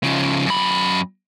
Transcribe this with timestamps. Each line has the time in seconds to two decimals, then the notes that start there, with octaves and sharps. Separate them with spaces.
0.03 C#3 F3
0.46 F#2 B5